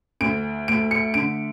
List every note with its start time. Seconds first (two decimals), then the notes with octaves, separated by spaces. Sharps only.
0.21 D2 D7
0.68 A3 D7
0.91 C#7
1.14 D3 D7